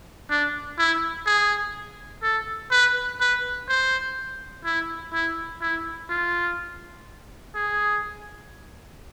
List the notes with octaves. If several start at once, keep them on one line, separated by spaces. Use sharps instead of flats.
D4
E4
G#4
A4
B4
B4
C5
E4
E4
E4
F4
G#4